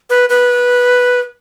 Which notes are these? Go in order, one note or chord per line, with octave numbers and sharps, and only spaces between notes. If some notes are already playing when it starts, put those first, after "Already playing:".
B4
B4